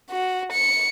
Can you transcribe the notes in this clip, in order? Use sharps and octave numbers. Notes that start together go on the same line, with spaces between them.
F#4
C#7